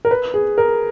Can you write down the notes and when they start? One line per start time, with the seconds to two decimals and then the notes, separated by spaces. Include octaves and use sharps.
0.05 A#4
0.11 B4
0.34 G#4
0.58 A#4